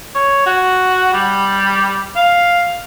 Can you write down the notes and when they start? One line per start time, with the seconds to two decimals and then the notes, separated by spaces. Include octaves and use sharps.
0.15 C#5
0.46 F#4
1.13 G3
2.16 F5